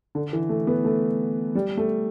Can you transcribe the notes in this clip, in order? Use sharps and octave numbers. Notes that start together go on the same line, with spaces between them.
D3
E3
A3
B3
A3
G3
A3